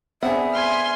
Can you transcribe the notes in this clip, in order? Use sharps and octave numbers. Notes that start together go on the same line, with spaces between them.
B3 C4 D4 G#4 E5 F#5
G#5 C6 F6